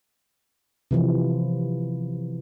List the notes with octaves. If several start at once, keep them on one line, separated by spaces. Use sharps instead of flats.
C3 E3 F3